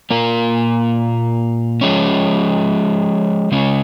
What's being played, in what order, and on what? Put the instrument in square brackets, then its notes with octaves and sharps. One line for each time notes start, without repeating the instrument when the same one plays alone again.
[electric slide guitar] A#2 A#3 F4 A#4
F3 G#3 C#4
C#3 G#3 C#4